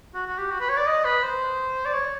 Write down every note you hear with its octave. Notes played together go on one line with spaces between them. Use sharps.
F#4
F#4
G4
F#4
B4
C#5
D5
D#5
B4
C5
D5
C#5